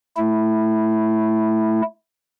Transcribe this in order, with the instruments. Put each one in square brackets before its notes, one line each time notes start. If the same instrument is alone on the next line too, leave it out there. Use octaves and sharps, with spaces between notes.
[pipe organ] A3 E4